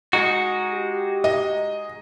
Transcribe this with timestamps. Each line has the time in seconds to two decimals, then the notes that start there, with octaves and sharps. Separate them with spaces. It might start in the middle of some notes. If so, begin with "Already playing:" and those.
0.13 G#3 D#4 F#4
0.72 G4
1.24 D#5